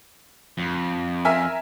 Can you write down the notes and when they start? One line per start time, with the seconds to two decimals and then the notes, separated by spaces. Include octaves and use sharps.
0.58 F2
1.25 A#4 E5 G#5